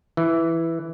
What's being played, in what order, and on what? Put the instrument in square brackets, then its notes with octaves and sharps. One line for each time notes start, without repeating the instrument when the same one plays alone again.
[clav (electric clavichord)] E3